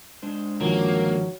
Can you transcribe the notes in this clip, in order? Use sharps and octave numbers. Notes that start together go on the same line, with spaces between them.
G#3 D4 C5
G1 D#3 F3 F#3 A#3